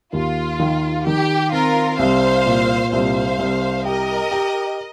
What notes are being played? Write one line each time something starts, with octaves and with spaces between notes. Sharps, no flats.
D#2 F4
D#3
D#3 G4
C4 F4 A#4
C2 C5 F5
A#2
C2 C5 F5
C2
G4 A#4 D#5
G4